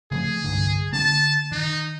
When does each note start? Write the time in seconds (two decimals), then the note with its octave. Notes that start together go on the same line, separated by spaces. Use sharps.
0.11 C#3 F3 A3 G#4
0.44 C2 G2 D3
0.93 D3 A#3 A5
1.52 D#3 D#4